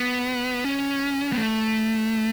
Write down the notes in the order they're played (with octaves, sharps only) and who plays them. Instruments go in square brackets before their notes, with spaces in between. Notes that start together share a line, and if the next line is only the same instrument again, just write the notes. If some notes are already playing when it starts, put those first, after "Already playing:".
Already playing: [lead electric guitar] B3
C#4
B3
A3